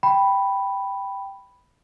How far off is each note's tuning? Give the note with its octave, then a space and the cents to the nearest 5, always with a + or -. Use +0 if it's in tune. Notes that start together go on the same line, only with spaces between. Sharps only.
G5 +0 B5 +0